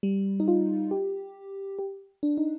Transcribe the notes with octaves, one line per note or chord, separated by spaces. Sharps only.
G3
D#4
F4
G4
G4
D4
D#4